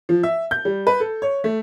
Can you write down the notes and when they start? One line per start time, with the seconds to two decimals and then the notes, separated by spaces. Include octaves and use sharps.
0.09 F3
0.23 E5
0.51 G6
0.65 G3
0.87 B4
1.00 A4
1.22 C#5
1.44 A3